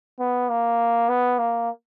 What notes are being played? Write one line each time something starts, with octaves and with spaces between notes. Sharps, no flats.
B3
A#3
B3
A#3